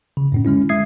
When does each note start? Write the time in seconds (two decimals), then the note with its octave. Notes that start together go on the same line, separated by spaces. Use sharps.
0.17 C#3
0.32 F#2 A2 C#4
0.45 D3 G#3 C#4 E4
0.69 G#3 E5 D#6 G#6 C7